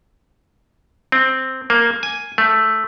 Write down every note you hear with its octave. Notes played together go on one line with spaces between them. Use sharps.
C4
A#3
G#5
A3